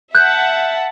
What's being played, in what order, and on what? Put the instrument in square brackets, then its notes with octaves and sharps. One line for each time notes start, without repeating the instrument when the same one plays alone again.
[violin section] E5 F#5 A5 [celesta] F#6 G6